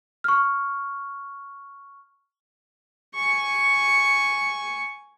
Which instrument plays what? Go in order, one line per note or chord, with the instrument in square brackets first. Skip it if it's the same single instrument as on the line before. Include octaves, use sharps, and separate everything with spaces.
[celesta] C#6 F6
[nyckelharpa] G#5 C#6